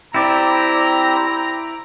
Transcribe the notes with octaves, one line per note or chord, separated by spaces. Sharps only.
C4 E4 G4 C5 D5 A#5